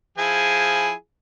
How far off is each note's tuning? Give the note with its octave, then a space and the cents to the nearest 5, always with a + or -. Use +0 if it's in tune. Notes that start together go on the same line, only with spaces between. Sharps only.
F3 +0 E4 +0 G#4 +0